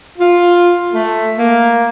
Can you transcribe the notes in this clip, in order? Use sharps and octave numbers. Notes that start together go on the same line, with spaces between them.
F4
A3
A#3